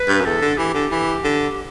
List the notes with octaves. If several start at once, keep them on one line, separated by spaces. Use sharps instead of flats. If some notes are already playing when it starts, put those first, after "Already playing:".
Already playing: B4
G2
F#2
E2 A4
D3
E3 G4
D3
E3
D3